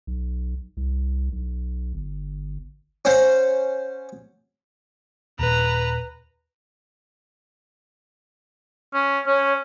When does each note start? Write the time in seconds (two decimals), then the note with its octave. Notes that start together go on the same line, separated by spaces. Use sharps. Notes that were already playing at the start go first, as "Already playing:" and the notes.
0.07 B1
0.77 C2
1.32 B1
1.94 G1
3.05 C#4 C5 F#5
5.39 D#1 B4 A#5
8.94 C#4
9.26 C#4 C#5